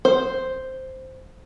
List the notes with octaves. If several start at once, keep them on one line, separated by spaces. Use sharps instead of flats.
C5